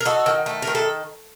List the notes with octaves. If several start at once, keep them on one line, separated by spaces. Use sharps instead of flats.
A#4
D#4 F#4 A4
D#3
A3
A#4
D#3
A4